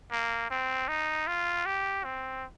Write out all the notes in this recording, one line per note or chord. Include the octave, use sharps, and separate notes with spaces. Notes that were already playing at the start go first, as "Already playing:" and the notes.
A#3
C4
D#4
F4
G4
C4